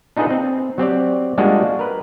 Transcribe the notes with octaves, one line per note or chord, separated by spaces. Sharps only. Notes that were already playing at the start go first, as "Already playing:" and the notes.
D4 D#4 F4 G#4 A4 B4
C4
F#3 C4 G4 D5
G3 G#3 A#3 D4 F4 F#4
F5
A#4 B4